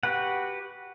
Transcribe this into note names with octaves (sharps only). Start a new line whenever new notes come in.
F#4 G4 B4 F#5